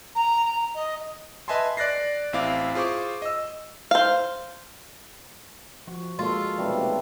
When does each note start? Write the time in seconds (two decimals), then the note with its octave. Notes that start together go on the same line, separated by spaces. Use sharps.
0.15 A#5
0.44 A#5
0.74 D#5
1.48 B4 D#5 E5 G#5 A5 C6
1.77 D5 F#6 A6 A#6 C7
2.33 A1 C4 E4 F5 D6
2.75 F4 G#4 C5 C#6 D6
3.22 D#5 E6
3.91 C5 F5
5.87 F3 F#4
6.19 G#3 A#3 F4 A4
6.58 B1 C3 G3 A3 B4 A#5